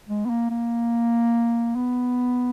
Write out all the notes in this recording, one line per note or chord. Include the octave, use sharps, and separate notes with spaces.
G#3
B3
A#3
A#3
B3